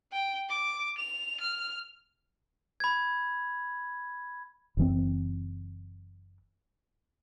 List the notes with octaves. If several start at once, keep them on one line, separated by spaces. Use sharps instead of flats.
G5
D6
F7
F6
B5 G#6
F#1 E3 C4